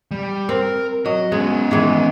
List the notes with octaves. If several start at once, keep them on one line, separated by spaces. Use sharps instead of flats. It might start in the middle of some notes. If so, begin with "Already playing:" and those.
G3
C4 A#4
F#3 D#5
G#3 B3 C#4
D#3 E3 G#3